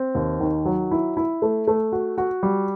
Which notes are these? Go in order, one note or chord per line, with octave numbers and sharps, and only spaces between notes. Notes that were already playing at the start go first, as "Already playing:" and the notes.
Already playing: C4
D#2
D#3
F#3
E4
E4
A3
A3
F#4
F#4
G3